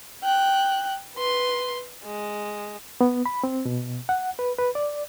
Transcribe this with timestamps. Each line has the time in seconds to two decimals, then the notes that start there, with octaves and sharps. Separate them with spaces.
0.23 G5 F#6
1.16 B4 C6
2.05 G#3
3.01 B3
3.26 B5
3.44 C4
3.65 B2
4.09 F#5
4.39 B4
4.58 B4
4.75 D5